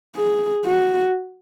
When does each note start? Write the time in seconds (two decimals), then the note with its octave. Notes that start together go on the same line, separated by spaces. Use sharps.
0.16 G#4
0.65 F#4